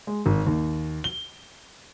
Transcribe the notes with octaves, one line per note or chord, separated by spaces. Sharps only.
G#3
G#1
D#2
G7